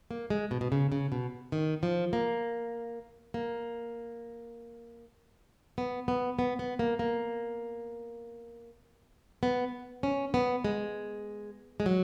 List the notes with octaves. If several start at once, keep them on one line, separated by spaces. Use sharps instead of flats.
A#3
G#3
B2
B2
C#3
C#3
B2
D#3
F3
A#3
A#3
B3
B3
B3
B3
A#3
A#3
B3
C#4
B3
G#3
G#3
F#3